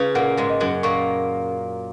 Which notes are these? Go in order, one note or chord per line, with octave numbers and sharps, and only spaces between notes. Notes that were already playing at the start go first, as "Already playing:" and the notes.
Already playing: C#3 C#4 D#4 F4 B4
A#2 A#3 F#5
G#2 G#3
D#5
F#2 F#3
A#2 A#3 C#6